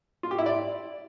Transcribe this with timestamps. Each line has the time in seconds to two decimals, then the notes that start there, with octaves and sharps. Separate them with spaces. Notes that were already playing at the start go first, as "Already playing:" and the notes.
0.23 F4
0.31 G4
0.38 E4
0.46 D5